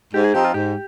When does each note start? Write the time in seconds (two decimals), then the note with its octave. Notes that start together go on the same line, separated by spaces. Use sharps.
0.14 G#2 G4
0.24 G#4
0.34 F3 C4 D#4 G4
0.45 F4
0.54 G#2 G4